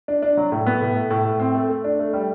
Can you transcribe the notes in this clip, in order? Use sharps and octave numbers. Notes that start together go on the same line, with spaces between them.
D4
D4
F#3
A2
B3
A2
A3
A2
A2
C4
A3
A3
D4
A3
G3